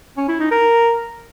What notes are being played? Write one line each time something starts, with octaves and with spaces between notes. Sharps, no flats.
C#4
E4
D#4
A#4